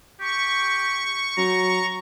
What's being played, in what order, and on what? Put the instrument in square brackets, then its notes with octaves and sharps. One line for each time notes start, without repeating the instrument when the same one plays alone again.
[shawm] G4 [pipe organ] C#6
[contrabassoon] F#3 [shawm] A#5